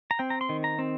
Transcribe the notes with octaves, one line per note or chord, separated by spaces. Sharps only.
A#5
C4 G5
A#5
C6
D#3
A#5
C4